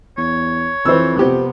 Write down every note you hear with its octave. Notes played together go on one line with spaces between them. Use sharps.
E2 C#5
F2 E3 C5 E6
C3 B3 C4 G4